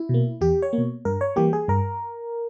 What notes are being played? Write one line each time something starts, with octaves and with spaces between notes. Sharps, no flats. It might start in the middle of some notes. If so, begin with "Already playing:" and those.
Already playing: E4
B2
A#3
E2 G4
C#5
A#3
B2
G2 A#4
C#5
E3 G3 A#3 G4
G#4
G2 A#4